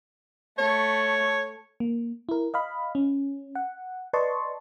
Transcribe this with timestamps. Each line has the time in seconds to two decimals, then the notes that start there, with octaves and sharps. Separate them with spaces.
0.58 A3 C#5
1.80 A#3
2.29 E4 A#4
2.54 D#5 F5 B5
2.95 C#4
3.55 F#5
4.13 B4 D5 D#5 A5 C6 C#6